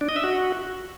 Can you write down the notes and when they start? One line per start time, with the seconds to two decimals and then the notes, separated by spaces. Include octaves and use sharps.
0.01 D4
0.09 D#5
0.16 E5
0.24 F#4